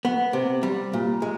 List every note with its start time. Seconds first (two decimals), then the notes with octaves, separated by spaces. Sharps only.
0.05 B3
0.33 C3
0.63 G3
0.93 A#2
1.22 G#3